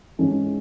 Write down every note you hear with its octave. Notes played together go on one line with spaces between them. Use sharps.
G#2 E3 G#3 C#4